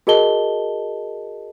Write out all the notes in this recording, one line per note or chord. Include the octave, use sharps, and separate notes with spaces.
F#4 G#4 A#4 D#5 A5 G7